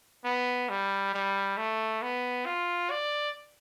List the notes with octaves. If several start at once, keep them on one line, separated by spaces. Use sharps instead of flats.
B3
G3
G3
A3
B3
F4
D5